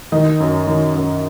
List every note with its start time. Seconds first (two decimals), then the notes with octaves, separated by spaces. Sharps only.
0.12 D#3 D#5
0.40 F#2
0.67 D#3
0.95 F#2